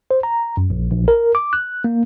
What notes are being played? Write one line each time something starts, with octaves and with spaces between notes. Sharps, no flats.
C5
A#5
F#2
A#1
A#1
A#4
D6
F#6
A#3